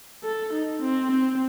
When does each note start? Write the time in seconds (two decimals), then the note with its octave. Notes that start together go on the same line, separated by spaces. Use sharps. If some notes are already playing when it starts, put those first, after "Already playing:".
0.24 A4
0.54 D#4
0.82 C4
1.11 C4